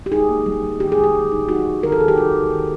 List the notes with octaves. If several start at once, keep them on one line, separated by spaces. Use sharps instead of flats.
G4
D#4 G#4
A#3
G3
G3
D#3 G4
G#4
G3
G4
G3
D#4
D#4 F#4
G3
D#3 A#4
A4
D#3 G#4
G4
D#4 F#4
D#4
D#3